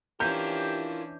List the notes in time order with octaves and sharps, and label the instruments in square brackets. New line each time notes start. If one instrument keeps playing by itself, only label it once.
[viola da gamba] E3 C#4 D4 [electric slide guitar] E4 F4 A#4 [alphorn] G4 [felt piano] G6